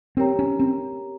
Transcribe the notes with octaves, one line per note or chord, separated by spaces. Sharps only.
C4 G4 A#4 C#5 G5 A#5
C#4
C4